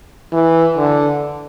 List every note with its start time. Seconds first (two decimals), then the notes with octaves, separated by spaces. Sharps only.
0.32 E3
0.77 D3